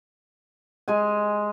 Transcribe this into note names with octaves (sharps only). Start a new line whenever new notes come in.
G#3 G#5